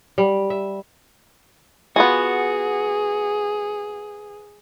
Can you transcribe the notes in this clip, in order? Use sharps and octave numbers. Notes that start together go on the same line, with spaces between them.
G3
E5
B3 F4 F#4 G#4 G#5